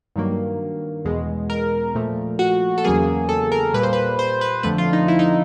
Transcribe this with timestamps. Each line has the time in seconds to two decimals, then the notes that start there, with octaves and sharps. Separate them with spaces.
0.16 G2 D#3 F#3 A#3
1.05 E2 B2 G#3
1.50 A#4
1.95 A#2 F3 A3
2.39 F#4
2.78 A4
2.84 E2 C#3 F#3 A#3 G#4
3.29 A4
3.52 A#4
3.74 A#2 G3 A#3 B4
3.83 C5
3.93 B4
4.19 C5
4.41 B4
4.63 F2 D3 F3 A3 B4
4.78 F4
4.93 D#4
5.08 E4
5.19 D#4